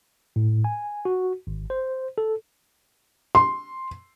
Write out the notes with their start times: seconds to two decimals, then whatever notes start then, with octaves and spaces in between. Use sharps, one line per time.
0.36 A2
0.64 G#5
1.05 F#4
1.47 G#1
1.70 C5
2.18 A4
3.35 C6